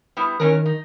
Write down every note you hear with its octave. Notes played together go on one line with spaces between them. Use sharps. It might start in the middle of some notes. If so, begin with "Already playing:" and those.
G3 B3 E4
D#3 E3 C#4 A#4
D#4